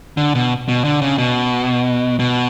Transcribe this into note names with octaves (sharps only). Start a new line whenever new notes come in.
D3
B2
B2
D3
C#3
B2
B2